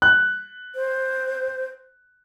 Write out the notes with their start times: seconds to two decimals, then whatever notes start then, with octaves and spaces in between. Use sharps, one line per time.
0.02 F#6
0.75 C5